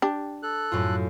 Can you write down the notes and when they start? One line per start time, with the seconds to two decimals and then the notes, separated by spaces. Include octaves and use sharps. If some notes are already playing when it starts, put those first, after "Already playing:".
0.02 D4 G4
0.43 A4 F#6
0.72 F#2 A2 F4